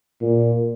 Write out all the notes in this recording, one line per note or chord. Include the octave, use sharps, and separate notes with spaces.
A#2